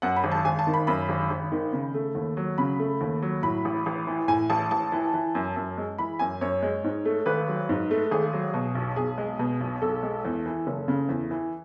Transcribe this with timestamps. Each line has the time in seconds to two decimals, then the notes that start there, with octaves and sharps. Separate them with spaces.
0.02 F#2 F#5
0.16 B5
0.24 G#1
0.31 A5
0.45 G#1 G#5
0.59 A5
0.67 D#3
0.74 B5
0.87 F#2 B5
1.09 G#1
1.30 G#1
1.52 D#3
1.73 C#3
1.94 A3
2.15 D#2
2.37 F#3
2.58 C#3 B5
2.79 A3
3.01 D#2
3.22 F#3
3.43 A2 B5
3.65 A1
3.86 A1
4.07 E3
4.28 A2 G#5
4.50 A1 A5
4.71 A1 A5
4.92 E3
5.14 E3
5.35 F#2
5.56 F#2
5.78 G#3
5.98 E3 B5
6.19 F#2 G#5
6.41 F#2 C#5
6.63 G#3
6.84 G#2
7.05 A3
7.26 G#1 B4
7.48 F#3
7.69 G#2
7.91 A3
8.11 G#1 G#4
8.33 F#3
8.54 B2
8.75 B1
8.96 B1 G#4
9.18 G#3
9.39 B2
9.61 B1
9.82 B1 A4
10.03 G#3
10.25 E2
10.46 E3
10.67 F#1
10.88 C#3
11.09 E2
11.31 E3